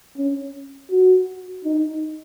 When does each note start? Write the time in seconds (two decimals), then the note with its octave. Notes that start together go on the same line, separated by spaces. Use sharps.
0.17 C#4
0.90 F#4
1.65 D#4